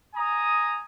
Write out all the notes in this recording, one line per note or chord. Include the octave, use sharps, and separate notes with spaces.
G#5 A#5 D#6